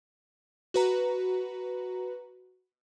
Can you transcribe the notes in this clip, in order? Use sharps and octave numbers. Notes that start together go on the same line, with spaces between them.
F#4 B4 A#5